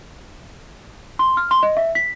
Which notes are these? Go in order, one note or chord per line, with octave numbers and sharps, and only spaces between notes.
C6
F6
C6
D#5
E5
B6